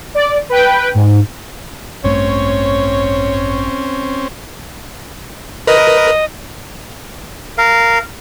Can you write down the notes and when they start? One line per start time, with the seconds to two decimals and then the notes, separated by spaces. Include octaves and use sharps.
0.15 D5
0.49 B4 G5
0.95 G#2
2.04 A1 G2 A3 C4 C#4 C#5
5.67 A#4 B4 D#5
7.58 A#4 F5